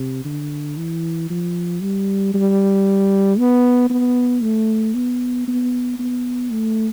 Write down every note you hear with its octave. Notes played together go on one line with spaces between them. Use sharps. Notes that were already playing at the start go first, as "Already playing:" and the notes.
Already playing: C3
D3
E3
F3
G3
G3
B3
B3
A3
B3
B3
B3
A3